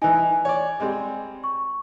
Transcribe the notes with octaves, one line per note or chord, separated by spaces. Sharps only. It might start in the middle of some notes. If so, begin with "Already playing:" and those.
E3 D#4 G#5
C#5 D5
G3 G#3 C4
C#6